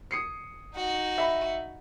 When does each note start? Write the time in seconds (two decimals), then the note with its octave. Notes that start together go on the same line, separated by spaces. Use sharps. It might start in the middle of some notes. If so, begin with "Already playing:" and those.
0.11 D#6 C7 C#7
0.76 D#4 F#4
1.18 E5 B5